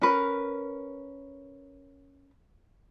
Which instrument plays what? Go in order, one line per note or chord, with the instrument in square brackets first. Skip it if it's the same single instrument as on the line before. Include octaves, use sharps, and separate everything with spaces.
[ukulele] C#4 A#4 B4